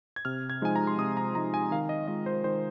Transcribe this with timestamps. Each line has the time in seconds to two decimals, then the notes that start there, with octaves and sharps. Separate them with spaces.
0.16 G#6
0.25 C3 F6
0.50 G#6
0.62 F3 G#3 D#4 G#5
0.76 A#5
0.87 C6
0.98 C3 D#6
1.17 A#5
1.34 F3 G#3 D#4 A#5
1.54 G#5
1.71 D#3 F5
1.89 D#5
2.08 G#3 F4 D#5
2.26 C5
2.44 D#3 C5